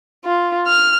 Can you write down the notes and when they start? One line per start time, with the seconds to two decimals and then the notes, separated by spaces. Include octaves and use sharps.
0.25 F4
0.68 F6